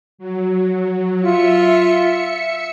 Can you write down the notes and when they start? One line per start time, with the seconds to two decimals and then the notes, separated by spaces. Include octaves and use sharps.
0.18 F#3
1.22 F4 E5 C#7